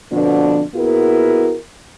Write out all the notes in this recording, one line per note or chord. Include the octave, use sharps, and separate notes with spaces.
F2 B2 D3 F3 B3 D4
A#2 B3 E4 F#4 G#4 A#4